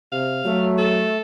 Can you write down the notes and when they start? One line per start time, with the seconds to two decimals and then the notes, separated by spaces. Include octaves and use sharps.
0.12 C3 F5
0.44 F#3 A3
0.78 A4